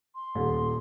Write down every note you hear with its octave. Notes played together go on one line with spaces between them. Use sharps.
C6
D#1 A#2